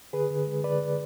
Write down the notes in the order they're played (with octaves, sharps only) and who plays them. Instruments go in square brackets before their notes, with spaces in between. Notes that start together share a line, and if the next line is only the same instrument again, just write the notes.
[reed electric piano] D3 G#4 B4
D3
G#3
D3 B4 D5